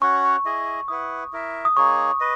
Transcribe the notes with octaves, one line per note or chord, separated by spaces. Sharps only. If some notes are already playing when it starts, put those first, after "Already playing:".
C#4 F#4 C#5 F#5 C#6
E4 G#4 D#5
E4 B4 F#5 D#6
E4 A#4 E5
D#6
A#3 D#4 G#4 C#5 C#6
B4 D#5